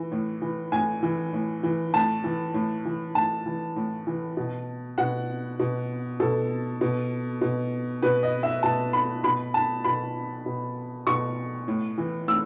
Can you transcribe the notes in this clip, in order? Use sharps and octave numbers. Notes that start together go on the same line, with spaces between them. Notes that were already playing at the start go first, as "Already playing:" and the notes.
Already playing: E3
A2
E3
A2 G#5
E3
A2
E3
A2 A5
E3
A2
E3
A2 A5
E3
A2
E3
B2
B2 F#5
B2
B2 A4
B2
B2
B2 B4
D#5
E5
B2 A5
B5
B2 B5
A5
B2 B5
B2
B2 C#6
A2
E3
A2 E6